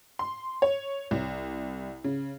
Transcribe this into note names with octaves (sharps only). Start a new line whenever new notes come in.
C6
C#5
C2
C#3